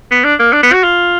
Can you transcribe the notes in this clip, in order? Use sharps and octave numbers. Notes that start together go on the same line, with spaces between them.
B3
D4
A#3
D4
B3
F#4
F4